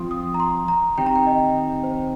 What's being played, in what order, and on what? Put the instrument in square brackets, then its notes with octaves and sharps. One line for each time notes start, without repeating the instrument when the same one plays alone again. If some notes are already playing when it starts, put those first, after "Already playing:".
Already playing: [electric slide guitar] F3 C4 F4 [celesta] C6 D#6
[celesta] D#6
A#5
C6
A#5
[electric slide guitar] D#3 C4 D#4 G4 [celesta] G5
[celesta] A#5
G5
D#5
C5